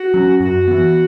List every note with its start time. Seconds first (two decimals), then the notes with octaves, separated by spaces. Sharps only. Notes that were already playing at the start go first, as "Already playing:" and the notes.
Already playing: F#4
0.14 F#3 C#4
0.40 F#2 F#4
0.68 E3 B3